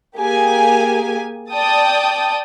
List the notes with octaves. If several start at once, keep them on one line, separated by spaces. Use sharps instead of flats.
A#3 G4 G#4 G#5
D5 G5 A5 D#6